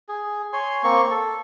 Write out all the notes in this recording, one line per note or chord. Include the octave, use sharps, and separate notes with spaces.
G#4
C#5 G#5 C6
A#3 C4 C#6
A4